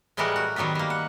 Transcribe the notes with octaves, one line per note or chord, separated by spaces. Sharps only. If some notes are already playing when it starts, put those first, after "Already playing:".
A2 E3 G3 G#3 A#4 F#5
F#4
D#3 F#3 G3 B3 B4
G3 A#3
F#5